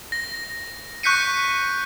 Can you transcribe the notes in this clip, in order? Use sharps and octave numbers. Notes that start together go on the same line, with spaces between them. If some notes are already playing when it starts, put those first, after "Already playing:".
A#6
C#6 F#6 G6 B6 C#7 D#7